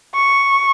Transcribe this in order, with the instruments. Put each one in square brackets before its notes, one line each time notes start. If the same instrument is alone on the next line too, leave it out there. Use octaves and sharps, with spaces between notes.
[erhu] C#6